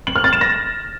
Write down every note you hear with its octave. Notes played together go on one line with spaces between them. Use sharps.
F#7
F6
A6
E7
A#6